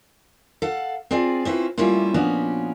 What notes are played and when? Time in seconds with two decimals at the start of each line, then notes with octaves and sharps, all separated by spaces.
0.62 A4 F5 F#5
1.11 C4 F4 G#4 D5
1.45 C4 C#4 E4 F4 B4
1.78 G3 A3 A#3 C#4 E4 F4
2.14 A#2 F3 B3 C#4 D4 F#4